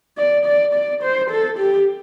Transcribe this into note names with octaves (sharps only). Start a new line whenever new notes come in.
D5
D5
D5
C5
A4
G4